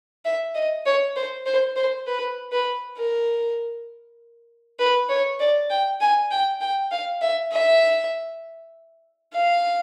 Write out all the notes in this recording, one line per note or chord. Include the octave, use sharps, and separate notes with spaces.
E5
D#5
C#5
C5
C5
C5
B4
B4
A#4
B4
C#5
D5
G5
G#5
G5
G5
F5
E5
E5
F5